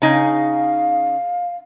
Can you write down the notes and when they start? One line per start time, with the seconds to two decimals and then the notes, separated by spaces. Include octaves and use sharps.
0.02 C#3 D#4 F5 G#5